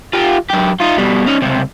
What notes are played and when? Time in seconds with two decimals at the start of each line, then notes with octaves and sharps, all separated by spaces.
0.13 F4 G4
0.50 F#2 G4
0.80 D#4 F4
0.98 B2 G3
1.27 C#4 D#4
1.42 C#2 C3